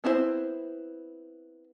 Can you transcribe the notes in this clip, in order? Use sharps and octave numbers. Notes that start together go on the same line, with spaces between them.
B3 C4 E4 G#4 C5